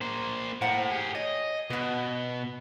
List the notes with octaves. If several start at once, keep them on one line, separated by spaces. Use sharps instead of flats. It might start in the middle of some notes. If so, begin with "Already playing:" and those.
A#3 C5
A2 A#3 C5 F#5
G4 G#4
C#5 D#5
B2 B3 G#4